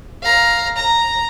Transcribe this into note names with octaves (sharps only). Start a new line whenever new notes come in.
F5 A#5
A#5